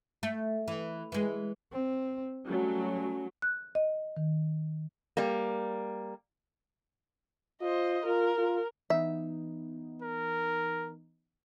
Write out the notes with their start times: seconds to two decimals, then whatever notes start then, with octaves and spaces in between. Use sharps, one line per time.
0.23 A3
0.68 E3
1.12 E3 G#3
1.72 C4
2.47 F#3 G3 A3 C#4
3.42 F#6
3.75 D#5
4.17 D#3
5.17 G3 A#3
7.61 F4 C5 D#5
8.06 F4 A#4
8.38 F4
8.90 E3 B3 D#4 E5
10.02 A#4